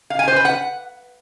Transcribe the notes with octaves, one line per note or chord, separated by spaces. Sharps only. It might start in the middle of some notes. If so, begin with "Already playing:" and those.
F5
G#5
C5
B4
F#5